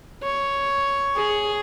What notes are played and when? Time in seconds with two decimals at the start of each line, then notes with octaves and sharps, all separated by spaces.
0.23 C#5
1.16 G#4